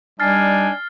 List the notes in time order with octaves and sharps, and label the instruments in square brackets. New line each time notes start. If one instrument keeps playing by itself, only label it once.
[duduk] G3 [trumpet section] D4 D#4 G#5 [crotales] F6 A6 C7